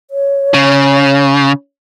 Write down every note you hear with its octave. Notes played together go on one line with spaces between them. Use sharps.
C#5
C#3